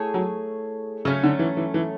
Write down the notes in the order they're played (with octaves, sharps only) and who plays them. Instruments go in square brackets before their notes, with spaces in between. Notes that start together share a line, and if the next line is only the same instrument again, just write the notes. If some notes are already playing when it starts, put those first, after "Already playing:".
Already playing: [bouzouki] A3 E4 G#4 C#5
[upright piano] F#3
[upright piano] C#3 [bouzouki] F#3 A3 C#4
[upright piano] D3
E3
E3
E3